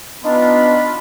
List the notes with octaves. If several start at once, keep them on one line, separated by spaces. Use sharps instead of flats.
B3 D4 D#4 F4 B5